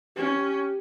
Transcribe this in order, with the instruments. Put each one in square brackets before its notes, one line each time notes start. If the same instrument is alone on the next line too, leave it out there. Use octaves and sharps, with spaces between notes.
[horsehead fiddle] C#4 [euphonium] G4